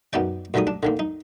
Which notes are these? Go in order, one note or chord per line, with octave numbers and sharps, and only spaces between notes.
F#2 B3 D#4 D5 G5
D2 D3 D#3 G3 A#5 D#6
D4
D3 D#3 A#3
D#4